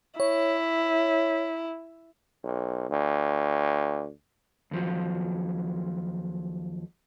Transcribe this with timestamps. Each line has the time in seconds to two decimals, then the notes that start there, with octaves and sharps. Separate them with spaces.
0.20 E4 C#5
2.44 B1
2.90 D2
4.71 D#2 F3 F#3